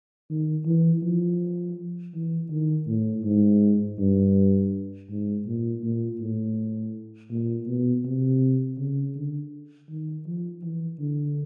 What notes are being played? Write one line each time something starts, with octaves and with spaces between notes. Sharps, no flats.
D#3
E3
F3
E3
D#3
A2
G#2
G2
G#2
A#2
A#2
A2
A#2
B2
C3
C#3
D3
D#3
F3
E3
D3